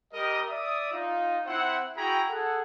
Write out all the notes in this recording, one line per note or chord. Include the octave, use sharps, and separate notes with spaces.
G3 A#4 D#5
D5 E5 D#6
D#4 F4
C4 E4 C5 E5 F#5
E4 F#4 G#4 G5 A#5 B5
G#4 A4 F#5